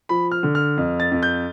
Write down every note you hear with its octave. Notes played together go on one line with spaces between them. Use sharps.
F3 B5
F6
D3
F6
F2
A6
F2
G6